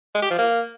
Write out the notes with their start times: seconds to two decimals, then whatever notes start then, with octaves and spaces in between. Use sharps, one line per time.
0.15 G#3
0.22 G4
0.30 F3
0.38 A#3